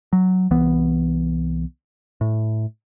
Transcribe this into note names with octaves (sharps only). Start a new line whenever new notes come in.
F#3
C2 E3 B3
A2